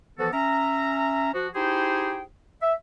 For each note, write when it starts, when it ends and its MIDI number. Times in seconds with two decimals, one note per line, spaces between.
0.18 0.29 52
0.18 0.29 53
0.18 0.29 59
0.18 0.29 66
0.18 0.29 69
0.33 1.29 61
0.33 1.29 76
0.33 1.29 82
1.34 1.47 53
1.34 1.47 66
1.55 2.23 63
1.55 2.23 64
1.55 2.23 67
1.55 2.23 68
1.55 2.23 72
1.55 2.23 79
2.61 2.73 76